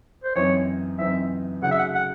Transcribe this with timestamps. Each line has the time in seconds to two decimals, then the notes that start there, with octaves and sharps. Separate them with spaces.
0.24 C5
0.35 F#2 E3 C4 D#4 C#5
0.99 F#2 E3 C4 D#4 E5
1.62 C#3 F#3 A3 D#4 F#5
1.71 E5
1.78 F#5
1.95 F#5